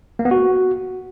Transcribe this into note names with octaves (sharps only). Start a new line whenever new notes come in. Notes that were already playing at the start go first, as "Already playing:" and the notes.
A#3
B3
F#4